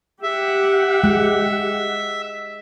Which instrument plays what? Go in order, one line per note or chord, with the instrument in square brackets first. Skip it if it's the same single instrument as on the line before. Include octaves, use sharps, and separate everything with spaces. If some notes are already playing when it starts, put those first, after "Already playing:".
[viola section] G4 F#5 [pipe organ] E5
[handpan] G#3